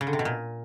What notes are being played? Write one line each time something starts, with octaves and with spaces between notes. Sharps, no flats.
C#3
D3
C3
B2
A#2